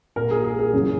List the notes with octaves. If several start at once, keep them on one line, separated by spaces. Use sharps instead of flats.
A#2 A#4
G#4
G#4
G#4
F#2 C#3 E3